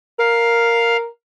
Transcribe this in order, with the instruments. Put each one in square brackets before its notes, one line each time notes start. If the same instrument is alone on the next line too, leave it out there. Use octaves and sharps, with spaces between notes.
[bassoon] A#4 [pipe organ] F5